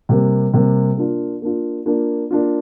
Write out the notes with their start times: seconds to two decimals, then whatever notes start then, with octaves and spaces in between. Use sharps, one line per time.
0.09 C3 G3 A#3
0.54 C3 G3 A#3
0.97 A#3 D4 F4
1.42 A#3 D4 F4
1.86 A#3 D4 F4
2.31 A#3 D4 F4